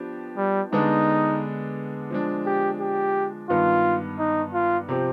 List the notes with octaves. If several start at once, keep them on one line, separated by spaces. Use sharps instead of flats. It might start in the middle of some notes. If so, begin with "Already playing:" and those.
Already playing: F3 B3 D4 G4
G3
D3 G#3 B3 D4 D#4
F3 G#3 D4
G4
G4
G2 D#3 B3 F4
D#4
F4
C3 F3 C4 G4